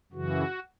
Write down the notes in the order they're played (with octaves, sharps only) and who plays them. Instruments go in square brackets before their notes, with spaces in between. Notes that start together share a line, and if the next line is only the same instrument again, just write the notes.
[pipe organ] F#2 C#3 E3 F#4